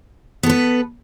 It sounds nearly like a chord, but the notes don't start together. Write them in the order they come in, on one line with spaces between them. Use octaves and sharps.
B3 A4 B4